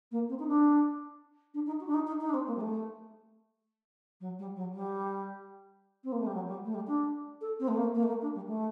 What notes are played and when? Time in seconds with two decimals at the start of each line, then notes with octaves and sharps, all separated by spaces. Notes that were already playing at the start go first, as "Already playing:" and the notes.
0.11 A#3
0.29 C4
0.39 D#4
0.47 D4
1.54 D4
1.66 D#4
1.80 F#4
1.87 D4
1.94 D#4
2.07 D#4
2.20 D#4
2.29 D4
2.33 C4
2.47 A#3
2.56 G3
2.60 A3
4.20 F#3
4.38 G3
4.55 F#3
4.73 G3
6.04 C4
6.12 A#3
6.20 A3
6.26 G3
6.34 F#3
6.47 G3
6.65 A3
6.74 G3
6.87 D4
7.41 A4
7.59 C4
7.68 A3
7.76 A#3
7.94 A#3
8.03 A3
8.07 A#3
8.21 D4
8.35 G3
8.47 A3